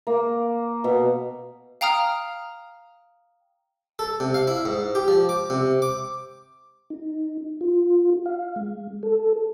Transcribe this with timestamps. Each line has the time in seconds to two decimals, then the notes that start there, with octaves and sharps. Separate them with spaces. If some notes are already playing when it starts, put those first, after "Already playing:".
0.07 A#3
0.84 B2
1.81 F5 G5 A#5 D#6 F6
3.99 A4
4.20 C3
4.34 F5
4.47 E4
4.65 G#2
4.95 G4
5.08 F3
5.29 D6
5.50 C3
5.82 D6
6.90 D#4
7.61 F4
8.26 F5
8.56 G#3
9.03 A4